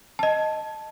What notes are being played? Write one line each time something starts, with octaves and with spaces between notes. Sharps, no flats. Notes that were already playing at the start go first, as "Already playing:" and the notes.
D#5 A5